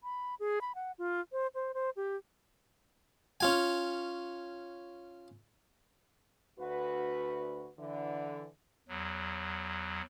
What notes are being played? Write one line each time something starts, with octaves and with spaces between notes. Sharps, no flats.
B5
G#4
B5
F#5
F4
C5
C5
C5
G4
C#4 F4 G#5
D2 F#4 B4
D3 E3
E2 F#3